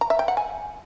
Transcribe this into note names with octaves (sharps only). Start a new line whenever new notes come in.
A#5
E5
G5
F#5
G#5